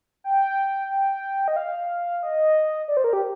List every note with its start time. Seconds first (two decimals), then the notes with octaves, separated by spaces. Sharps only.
0.24 G5
0.91 G5
1.48 D#5
1.56 F5
2.23 D#5
2.88 D5
2.97 C5
3.04 A#4
3.13 G4